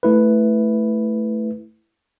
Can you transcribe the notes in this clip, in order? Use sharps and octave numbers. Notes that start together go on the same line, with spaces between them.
A3 E4 B4